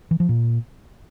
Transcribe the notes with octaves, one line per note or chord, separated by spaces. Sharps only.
E3
F3
A#2